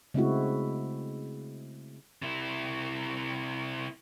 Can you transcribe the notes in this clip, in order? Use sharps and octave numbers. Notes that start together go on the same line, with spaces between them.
C#3 G#3 A3 C4 E4 F#4
C3 E4